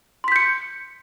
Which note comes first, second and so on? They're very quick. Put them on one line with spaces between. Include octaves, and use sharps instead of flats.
C6 B6 G6 C#7